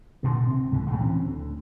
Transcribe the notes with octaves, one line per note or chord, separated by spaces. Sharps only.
G2 A#2 D3 D#3
C3 C4
C#2 A2 D3 E3
A2 C#3 E3 G#3
E3 C4 C#4
D2